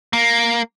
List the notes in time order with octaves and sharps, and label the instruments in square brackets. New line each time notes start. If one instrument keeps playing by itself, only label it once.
[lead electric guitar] A#3